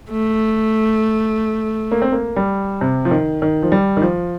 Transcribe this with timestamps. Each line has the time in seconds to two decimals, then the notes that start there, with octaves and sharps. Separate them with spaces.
0.12 A3
1.91 A#3
2.02 C4
2.12 A#3
2.36 G3
2.81 C3
3.05 F3
3.11 D#3
3.42 D#3
3.62 F3
3.72 G3
3.97 D#3
4.02 F3